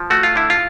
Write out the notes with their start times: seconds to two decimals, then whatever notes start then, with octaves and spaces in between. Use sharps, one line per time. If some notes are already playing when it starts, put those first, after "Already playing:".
Already playing: F3
0.10 A3 F#4
0.23 F4
0.36 D3 E4
0.50 F4